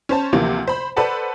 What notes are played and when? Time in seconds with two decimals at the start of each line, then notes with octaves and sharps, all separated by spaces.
0.09 C#4 C5 A5
0.33 D2 C3 E3 F3 A#3
0.68 C5 B5
0.96 A4 B4 C5 D5 F#5 A5